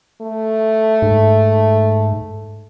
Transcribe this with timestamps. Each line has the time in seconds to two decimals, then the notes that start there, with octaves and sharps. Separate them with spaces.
0.22 A3
1.02 G#2